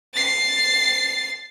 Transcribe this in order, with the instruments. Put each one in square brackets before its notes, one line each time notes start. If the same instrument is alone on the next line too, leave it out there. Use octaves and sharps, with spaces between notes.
[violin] A6 C7